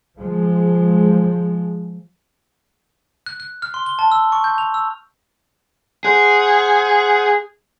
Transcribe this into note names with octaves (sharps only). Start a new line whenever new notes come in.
F3 G#3
F#6
F#6
F6
C6
G7
A5
E6
C#6
G6
F7
E6
G#4 C5 F#5